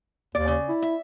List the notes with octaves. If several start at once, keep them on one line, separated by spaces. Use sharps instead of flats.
D#2 D5
C#3
E4
E5